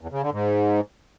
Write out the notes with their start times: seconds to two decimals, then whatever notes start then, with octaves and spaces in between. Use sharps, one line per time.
0.01 E2
0.12 C#3
0.22 D3
0.32 G#2